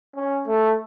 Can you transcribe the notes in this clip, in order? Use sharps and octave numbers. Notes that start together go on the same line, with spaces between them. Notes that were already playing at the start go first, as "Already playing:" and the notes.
C#4
A3